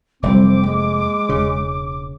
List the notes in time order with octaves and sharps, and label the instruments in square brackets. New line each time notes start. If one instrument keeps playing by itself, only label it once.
[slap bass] F1 [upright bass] F#3 G3 [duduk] C4 [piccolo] D6
[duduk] G#3 [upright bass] A#3
[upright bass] E1 [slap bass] C#3